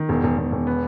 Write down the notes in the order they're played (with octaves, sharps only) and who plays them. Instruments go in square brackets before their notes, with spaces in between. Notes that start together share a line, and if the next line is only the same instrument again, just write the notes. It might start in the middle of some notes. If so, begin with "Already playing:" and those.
Already playing: [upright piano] D#3
E1
E1
E1
E1
B3